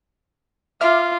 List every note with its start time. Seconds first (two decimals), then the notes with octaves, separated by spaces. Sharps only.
0.81 F4 E5 D6 F6